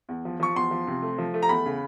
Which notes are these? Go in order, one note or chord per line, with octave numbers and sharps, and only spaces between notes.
E2
F3
F3 C#6
E2 C6
F3
C3
A3
F3
A3
A#5
E2 B5
C#3